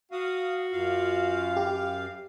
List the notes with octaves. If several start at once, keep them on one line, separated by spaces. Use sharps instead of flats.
F#4 F5 D#6
F#2 F4 F5
G4